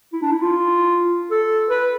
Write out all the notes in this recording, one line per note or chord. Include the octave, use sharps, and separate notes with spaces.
E4
D4
E4
F4
A4
B4